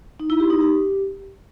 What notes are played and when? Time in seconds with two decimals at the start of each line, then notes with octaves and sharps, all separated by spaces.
0.20 D#4
0.30 E4
0.40 G4
0.50 D#4
0.60 G4